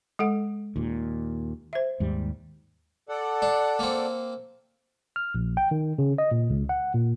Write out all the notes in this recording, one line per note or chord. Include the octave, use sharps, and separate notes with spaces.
G#3 A4 F#5
D#2 A#2
C5 E5
D#2 G#2 G3
A4 D5 F#5
D4
A#3 C4
F6
A#1
G5
D#3
C#3
D#5
A#2
C#2
F#5
A#2